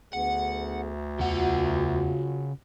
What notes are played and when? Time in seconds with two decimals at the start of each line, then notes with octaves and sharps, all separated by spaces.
0.13 D2 D3 B3 G#4 F#5
1.19 E2 C#3 F4 F#4 F#5